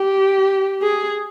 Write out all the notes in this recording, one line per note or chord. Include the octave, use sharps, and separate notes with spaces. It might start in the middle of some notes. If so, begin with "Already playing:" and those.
Already playing: G4
G#4